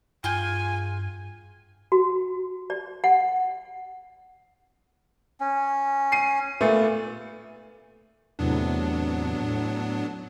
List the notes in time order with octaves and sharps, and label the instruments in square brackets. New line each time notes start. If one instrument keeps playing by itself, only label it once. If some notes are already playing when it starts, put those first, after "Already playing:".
[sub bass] G2 [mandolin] F4 G#4 G5 [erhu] G#5
[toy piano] F#4
D5
F#5
[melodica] C#4
[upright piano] C7 D#7
A#2 A3 B3
[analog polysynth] E2 A2 C3 [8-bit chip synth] F#3 B3 D4
[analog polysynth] A2